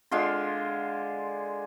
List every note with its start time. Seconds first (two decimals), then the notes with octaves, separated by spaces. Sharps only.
0.12 D3 G#3 F4 C6